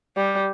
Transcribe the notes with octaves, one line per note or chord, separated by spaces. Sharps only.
G3